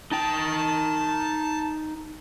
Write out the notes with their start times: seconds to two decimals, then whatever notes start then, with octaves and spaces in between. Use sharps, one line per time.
0.11 D#4 G5 A5